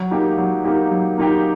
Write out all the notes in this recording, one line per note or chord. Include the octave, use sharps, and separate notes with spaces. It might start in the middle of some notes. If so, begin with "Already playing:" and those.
Already playing: F#3
A#3 D#4 G4
F#3
A#3 D#4 G4
F#3
A#3 D#4 G4